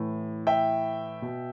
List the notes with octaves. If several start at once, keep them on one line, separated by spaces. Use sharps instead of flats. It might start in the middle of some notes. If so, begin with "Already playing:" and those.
Already playing: A2 E3
E5 G5
B2